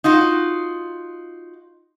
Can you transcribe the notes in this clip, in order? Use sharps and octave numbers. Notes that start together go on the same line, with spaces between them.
D#4 F4 F#4